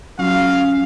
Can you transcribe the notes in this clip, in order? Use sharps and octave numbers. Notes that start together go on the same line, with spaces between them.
F#3 C#4 F4 F5